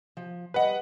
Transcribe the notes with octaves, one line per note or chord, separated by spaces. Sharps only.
F3
G3 B4 D#5 F#5